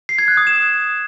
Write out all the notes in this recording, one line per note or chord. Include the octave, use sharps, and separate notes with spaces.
C7
G#6
F#6
D#6
E7